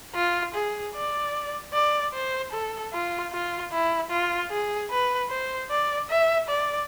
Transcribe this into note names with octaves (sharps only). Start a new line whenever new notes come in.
F4
G#4
D5
D5
C5
A4
F4
F4
E4
F4
G#4
B4
C5
D5
E5
D5